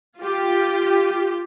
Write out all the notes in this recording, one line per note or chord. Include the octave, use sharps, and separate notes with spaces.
F4 G4